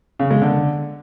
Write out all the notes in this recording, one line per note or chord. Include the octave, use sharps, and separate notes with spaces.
C#3
G#3
D3